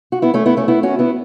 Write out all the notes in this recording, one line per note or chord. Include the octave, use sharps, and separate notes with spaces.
F#4
B3 E4
A3 C#4
B3 E4
A3 C#4
B3 E4
C#4 F#4
B3 E4